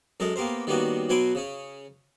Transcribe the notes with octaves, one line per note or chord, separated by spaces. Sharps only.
F#2 G#3 A4 A#4
A#3 B3 G4 A#4 C5
D#3 G3 A#3 B3 C#4 F#4
B2 F#3 B4 G#5 C6 D6
C#3 C#4